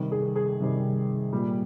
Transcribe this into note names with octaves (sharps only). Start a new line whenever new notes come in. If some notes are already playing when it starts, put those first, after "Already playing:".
Already playing: C3 D#3 G3
G#4
G#4
C3 D#3 G3
A#2 G3